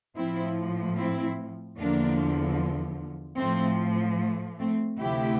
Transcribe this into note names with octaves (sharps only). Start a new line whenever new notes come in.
A2 F3 C4 E4
C4 E4
E2 D3 F3 A#3 D4
A2 F3 A3 C4
A3
A3 C4
D2 C3 F3 E4 G4